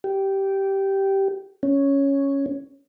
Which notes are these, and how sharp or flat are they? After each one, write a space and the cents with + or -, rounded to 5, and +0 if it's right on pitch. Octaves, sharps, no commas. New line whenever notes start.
G4 -10
C#4 +0